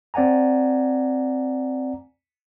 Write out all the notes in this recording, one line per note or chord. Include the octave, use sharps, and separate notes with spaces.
C4 D5 F#5 G#5 A#5